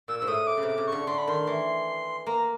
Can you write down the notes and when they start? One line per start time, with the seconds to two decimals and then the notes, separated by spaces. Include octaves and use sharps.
0.08 A#2 E6
0.19 G#2 E6
0.27 A2 D#6
0.47 D6
0.57 C#3
0.63 C3
0.68 D6
0.78 C#3
0.87 D3 C#6
1.07 D3 C6
1.18 B5
1.27 D#3 C6
1.47 E3
2.26 A#3 A#5